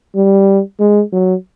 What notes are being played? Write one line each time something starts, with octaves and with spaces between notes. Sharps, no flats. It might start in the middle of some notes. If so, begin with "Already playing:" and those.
G3
G#3
F#3